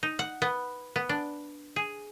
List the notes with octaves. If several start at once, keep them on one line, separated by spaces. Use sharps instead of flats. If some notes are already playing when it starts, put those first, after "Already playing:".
D#4
F#5
B3
B3
D4
G#4